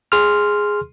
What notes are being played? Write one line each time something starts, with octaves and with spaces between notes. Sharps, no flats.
G#4 C6 F6